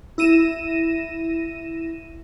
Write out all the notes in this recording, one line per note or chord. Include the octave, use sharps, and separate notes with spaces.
E4 A#6 D#7 E7